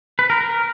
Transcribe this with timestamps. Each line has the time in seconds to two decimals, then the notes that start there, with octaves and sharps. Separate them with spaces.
0.19 B4
0.30 A#4
0.41 A#4